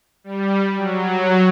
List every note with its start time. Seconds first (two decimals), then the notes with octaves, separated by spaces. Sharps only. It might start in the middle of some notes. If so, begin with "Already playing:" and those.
0.24 G3
0.77 F#3